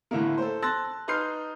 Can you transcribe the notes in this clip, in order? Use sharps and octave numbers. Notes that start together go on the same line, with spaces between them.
A2 D3 E3 A3 A#3
A4 C5
A5 C6 E6 F#6 A6 A#6
D#4 B4 C6 F6 G6 C7